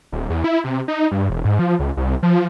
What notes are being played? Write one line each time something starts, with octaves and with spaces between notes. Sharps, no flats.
D#1
E2
E4
C3
D#4
G2
E1
G#2
F3
C#2
C2
F3